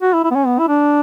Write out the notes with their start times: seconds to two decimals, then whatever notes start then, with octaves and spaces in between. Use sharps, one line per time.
0.02 F#4
0.13 E4
0.24 E4
0.31 B3
0.35 C#4
0.46 B3
0.59 E4
0.68 D4